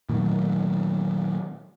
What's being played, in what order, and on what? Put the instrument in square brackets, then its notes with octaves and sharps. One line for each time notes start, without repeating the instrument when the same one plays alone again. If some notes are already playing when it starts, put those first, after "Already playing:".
[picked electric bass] A#2 D#3 F#3 A3